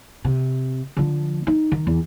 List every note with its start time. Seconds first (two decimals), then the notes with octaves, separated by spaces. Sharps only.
0.24 C3
0.97 D3 F3
1.47 D#4
1.72 D#3
1.87 E2